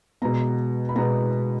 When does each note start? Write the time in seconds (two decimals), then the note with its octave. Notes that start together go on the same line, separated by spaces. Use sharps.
0.22 B2 G#3 B3 A#5
0.89 B5
0.96 B2 G#3 B3 A#5